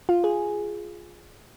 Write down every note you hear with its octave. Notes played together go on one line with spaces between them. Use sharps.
F4
G#4